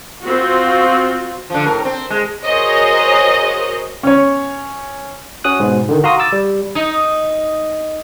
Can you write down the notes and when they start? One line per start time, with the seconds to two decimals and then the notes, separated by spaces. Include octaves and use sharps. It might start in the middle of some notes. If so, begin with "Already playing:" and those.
0.23 C4 F4 F#4
1.50 D3 F3
1.65 A2 A#4
1.85 C4
2.10 G#3
2.45 F#4 G#4 A#4 C5 C#5 D#5
4.03 C#4 C#5
5.44 C#4 F#4 D#6 F#6
5.60 G#2 B2
5.89 D3 D#3
6.04 F#4 F5 A#5 C6 D#6
6.19 D6 E6 A6
6.32 G3
6.75 D#4